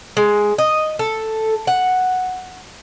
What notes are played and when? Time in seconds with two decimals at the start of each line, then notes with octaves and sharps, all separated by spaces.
0.17 G#3
0.58 D#5
0.99 A4
1.67 F#5